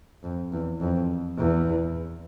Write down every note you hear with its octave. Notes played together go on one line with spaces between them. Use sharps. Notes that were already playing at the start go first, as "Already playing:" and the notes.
F2
E2
F2
E2